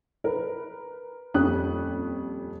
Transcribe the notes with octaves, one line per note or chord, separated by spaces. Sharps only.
A#4 B4
D#1 F2 C#4 G4 D#6 F#6